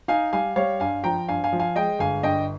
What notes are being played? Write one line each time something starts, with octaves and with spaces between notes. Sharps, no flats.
D#4 F5 G#5
G3 F5 G#5
G3 C#5 F5
G2 F5 G#5
F3 G5 A#5
G2 F5 G#5
F5 G#5
F3
F5 G#5
G#3 D#5 G5
G1 F5 G#5
G2 D#5 G5